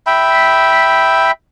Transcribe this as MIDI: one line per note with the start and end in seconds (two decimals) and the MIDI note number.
0.07 1.31 76
0.07 1.31 79
0.07 1.31 83